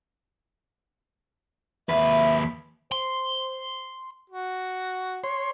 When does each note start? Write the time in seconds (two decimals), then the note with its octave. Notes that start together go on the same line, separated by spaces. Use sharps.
1.89 D#2 B4 E5
2.92 C5 C6
4.30 F#4
5.24 C#5 C6